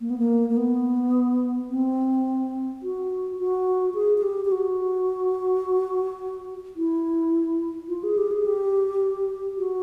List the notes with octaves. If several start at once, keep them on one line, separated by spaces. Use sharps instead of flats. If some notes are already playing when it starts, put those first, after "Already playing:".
A#3
B3
A#3
A#3
B3
C4
F#4
F#4
G#4
G#4
G4
G4
F#4
E4
F4
G#4
G4
G#4
G4
F#4